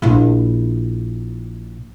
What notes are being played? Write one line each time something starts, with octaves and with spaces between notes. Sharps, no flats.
A#1 E4